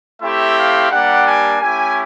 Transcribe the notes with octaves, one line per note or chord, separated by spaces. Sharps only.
A3 C4 E4 G4 E5
F5
G3 A#3 D4 G4 F#5
G#5
A3 C#4 E4 G4 G#5